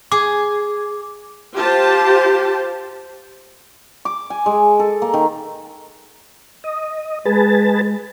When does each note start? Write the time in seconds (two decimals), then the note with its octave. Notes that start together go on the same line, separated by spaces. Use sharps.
0.12 G#4 D6
1.57 F4 G4 C5 A5
4.05 D6
4.30 G#5
4.46 G#3
4.80 A4
5.02 A#3
5.14 D#3
6.64 D#5
7.25 G#3 G#4 B4 A5